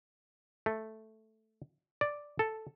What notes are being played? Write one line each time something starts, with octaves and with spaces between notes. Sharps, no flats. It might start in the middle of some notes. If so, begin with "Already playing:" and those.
A3
D5
A4